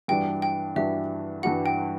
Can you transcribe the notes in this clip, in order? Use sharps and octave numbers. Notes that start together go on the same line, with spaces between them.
G2 E3 G3 D4 F#4 G5
G5
G2 E3 G3 D4 F#4 E5
G2 E3 G3 D4 F#4 F#5
G5